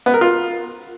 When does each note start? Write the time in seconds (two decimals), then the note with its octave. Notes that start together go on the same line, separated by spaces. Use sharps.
0.06 B3
0.14 A#4
0.21 F4